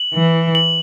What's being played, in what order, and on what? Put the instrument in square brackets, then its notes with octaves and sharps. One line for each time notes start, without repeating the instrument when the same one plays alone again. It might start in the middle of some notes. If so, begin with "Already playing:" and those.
Already playing: [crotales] F#7
[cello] E3
[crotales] F#7